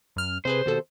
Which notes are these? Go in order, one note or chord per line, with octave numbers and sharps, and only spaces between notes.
F#2 F6
C3 G#4 B4 C5
D#2 B2 A4